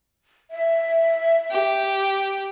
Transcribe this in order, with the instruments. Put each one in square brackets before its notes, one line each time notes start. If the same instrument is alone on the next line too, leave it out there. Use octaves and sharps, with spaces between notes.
[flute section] E5
[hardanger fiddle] G4